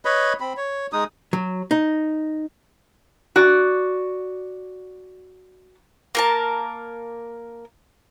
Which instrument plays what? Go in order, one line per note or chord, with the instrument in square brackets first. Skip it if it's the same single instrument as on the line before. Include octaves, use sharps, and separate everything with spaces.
[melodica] B4 C#5 D#5 B5
C4 B5
C#5
G#3 D#4 D#6
[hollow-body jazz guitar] F#3
D#4
[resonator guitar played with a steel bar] F#4 D5
[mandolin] A#3 A#4 A5